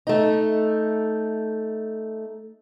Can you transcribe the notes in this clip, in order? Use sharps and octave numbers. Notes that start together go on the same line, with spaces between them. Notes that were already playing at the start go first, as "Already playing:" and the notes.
A3 D#4